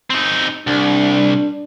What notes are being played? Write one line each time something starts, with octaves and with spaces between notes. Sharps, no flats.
C4 D#4
C2 D4